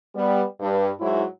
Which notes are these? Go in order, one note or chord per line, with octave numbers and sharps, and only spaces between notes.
G3 B3
G2
G#2 F#3 G#3 E4